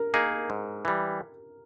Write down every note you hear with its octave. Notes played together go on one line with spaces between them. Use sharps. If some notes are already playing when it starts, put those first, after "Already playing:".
Already playing: A#4
A#3 D#4 G#4
G#2
E3 G3